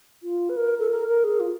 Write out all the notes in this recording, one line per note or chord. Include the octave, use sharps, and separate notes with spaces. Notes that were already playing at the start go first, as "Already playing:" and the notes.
F4
B4
A#4
A4
A#4
A#4
G#4
F4